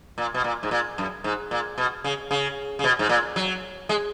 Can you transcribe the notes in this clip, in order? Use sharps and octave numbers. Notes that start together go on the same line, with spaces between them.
A#2
B2
A#2
G#2
A#2
F#2
G#2
A#2
B2
C#3
C#3
C#3
B2
G#2
A#2
F#3
G#3